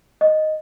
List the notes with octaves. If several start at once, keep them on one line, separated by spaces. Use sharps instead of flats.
D#5